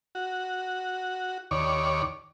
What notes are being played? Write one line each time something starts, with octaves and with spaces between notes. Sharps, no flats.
F#4
D#2 C#5 D5